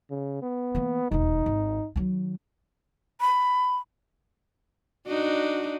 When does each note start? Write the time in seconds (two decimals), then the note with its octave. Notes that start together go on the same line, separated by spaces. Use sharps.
0.10 C#3
0.42 B3
0.75 E3 A#3
1.11 E1 D#2 D#4
1.46 G#1
1.96 D#3 F#3
3.21 B5
5.07 D4 D#4 F#4